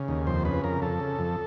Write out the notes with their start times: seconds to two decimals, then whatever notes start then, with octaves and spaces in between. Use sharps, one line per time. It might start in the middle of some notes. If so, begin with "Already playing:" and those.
Already playing: C#3
0.08 D#2
0.27 F2 C5
0.45 C#3 B4
0.64 F2 A#4
0.82 F2 A4
1.00 C#3
1.19 F2